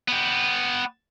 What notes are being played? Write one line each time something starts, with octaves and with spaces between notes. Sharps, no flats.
B3 G4